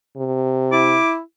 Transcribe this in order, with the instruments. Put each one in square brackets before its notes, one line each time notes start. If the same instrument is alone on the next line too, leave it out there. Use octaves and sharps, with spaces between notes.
[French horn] C3
[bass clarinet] E4 [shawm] D6